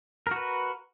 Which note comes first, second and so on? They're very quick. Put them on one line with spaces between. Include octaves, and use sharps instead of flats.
A#4 F#4 B4